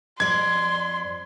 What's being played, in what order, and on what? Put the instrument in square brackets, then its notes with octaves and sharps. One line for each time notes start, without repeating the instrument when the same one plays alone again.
[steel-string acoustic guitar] F2 D5 [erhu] C6 [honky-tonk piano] G#6